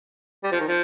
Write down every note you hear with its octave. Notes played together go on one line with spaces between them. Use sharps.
G3
F3
D#3
F3